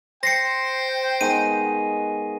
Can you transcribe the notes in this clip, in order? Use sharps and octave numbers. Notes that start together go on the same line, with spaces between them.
C5 G5 A#6 C7 C#7
D#3 G#3 B3 D#7